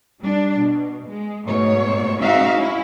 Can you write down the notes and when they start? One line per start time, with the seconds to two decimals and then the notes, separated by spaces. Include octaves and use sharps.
0.21 G3 D4
0.58 B2
1.08 G#3
1.45 G#2 B2 A3 C#5
2.20 G#3 C4 D#4 F#4 E5 F5
2.53 C#4 E4